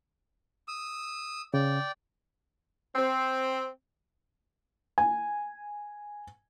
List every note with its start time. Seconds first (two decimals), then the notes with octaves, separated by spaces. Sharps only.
0.68 D#6 E6
1.54 C#3 D5 G5
2.95 C4
4.98 G#5